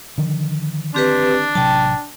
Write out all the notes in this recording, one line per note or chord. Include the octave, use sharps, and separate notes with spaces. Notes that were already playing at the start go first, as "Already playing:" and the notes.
D3 D#3 F3
C4 D4 G4 B4
A1 C3 F#3 G5 A5